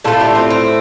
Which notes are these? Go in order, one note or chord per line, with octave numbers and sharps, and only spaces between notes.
A2 A3 F4 A4
D4 G4
C4 F4
C4